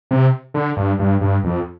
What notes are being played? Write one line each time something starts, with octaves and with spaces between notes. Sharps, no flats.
C3
D3
G2
G2
G2
F2